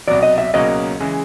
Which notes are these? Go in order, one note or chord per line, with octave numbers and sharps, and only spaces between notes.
C2 B2 F#3 D5
D#5
E5
C#2 B2 F#3 A#3 C#4 D#5
C#3 E3 G#3